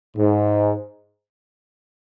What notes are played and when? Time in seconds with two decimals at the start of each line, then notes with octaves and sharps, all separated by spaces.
0.17 G#2